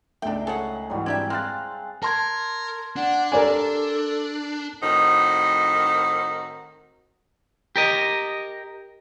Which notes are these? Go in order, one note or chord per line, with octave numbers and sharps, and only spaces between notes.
C#2 A3 D4 D#4 G#4 A#4 E5 G5
G#4 A4 C#5 F#5
G#2 E3 F#3 G3 F#4
C4 D4 G4 E5 G5 G#6
C4 G#4 F5 C6 F6 F#6 A6
A#4 A5 C6 G#6
D4 F#5
A4 A#4 D5 G#5
A2 D#3 C4 D#4 F#4
G4 A#4 D#5